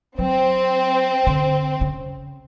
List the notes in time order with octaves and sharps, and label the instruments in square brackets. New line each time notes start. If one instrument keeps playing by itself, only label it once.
[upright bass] F#3 [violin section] C4
[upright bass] D3
C#3